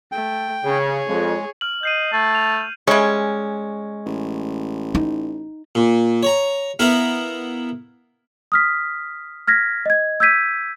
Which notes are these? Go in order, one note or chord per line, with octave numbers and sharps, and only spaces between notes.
A3 G5
C#3 G#4 C#5
F2 G#3
F6 F#7
D#5 G6 C7 D#7
A3 A5 G#6
F7
G3 G#3 C#4
A1
D#4
A#2
C#5 A#5
B3 E4 A#4 F5
D#6 F6 B6
F6 G#6 A#6 B6
D#5 G#6
E6 G6 G#6 B6 D#7